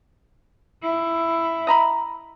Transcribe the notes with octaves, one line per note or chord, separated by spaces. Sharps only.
E4
D#5 A#5 B5